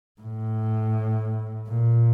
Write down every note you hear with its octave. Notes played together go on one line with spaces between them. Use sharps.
A2
A#2